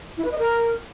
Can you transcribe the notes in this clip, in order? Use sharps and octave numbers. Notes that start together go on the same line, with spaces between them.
E4
B4
D#5
A#4